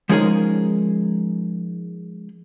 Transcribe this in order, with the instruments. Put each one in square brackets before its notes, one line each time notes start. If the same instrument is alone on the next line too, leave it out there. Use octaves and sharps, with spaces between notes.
[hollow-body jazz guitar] F3 G#3 C#4 D#4 G#4 A#4